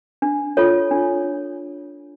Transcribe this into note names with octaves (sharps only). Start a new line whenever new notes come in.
D4
F4 A4 C#5
D4